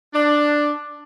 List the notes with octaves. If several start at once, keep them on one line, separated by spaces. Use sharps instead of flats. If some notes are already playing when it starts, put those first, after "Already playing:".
D4